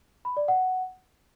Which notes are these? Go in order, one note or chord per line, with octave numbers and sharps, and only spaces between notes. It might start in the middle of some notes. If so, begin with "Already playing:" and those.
B5
D5
F#5